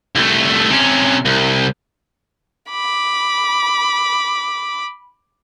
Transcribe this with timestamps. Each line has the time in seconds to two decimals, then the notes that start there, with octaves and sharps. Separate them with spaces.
0.15 C2 A3
0.70 C3 C#4
1.25 C2
2.70 B5 D6